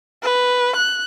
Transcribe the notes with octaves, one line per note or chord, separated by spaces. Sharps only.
B4
F#6